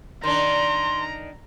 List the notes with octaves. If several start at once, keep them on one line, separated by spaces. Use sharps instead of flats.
D#3 D4 A#5 C6